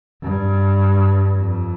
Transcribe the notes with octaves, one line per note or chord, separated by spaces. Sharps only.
G2
F2